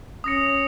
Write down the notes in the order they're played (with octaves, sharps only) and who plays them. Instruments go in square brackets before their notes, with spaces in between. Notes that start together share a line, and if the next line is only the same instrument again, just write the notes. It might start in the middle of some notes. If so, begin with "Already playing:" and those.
[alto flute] C#4 [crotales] D#6 A#6 C#7